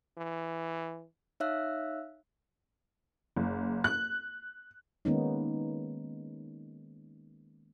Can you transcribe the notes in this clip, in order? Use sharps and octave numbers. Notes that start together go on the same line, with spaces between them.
E3
D#4 C#5 E5 F5 E6 F#6
F#1
F#6
D#3 G#3 A#3 B3 C#4 D#4